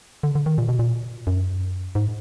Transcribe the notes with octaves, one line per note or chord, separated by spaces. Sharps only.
D3
D3
D#3
A#2
B2
A#2
F#2
G#2